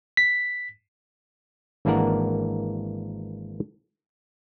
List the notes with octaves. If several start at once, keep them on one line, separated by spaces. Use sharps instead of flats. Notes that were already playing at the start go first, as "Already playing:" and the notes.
B6
G#1 E3 A#3 D4 A#4 F#5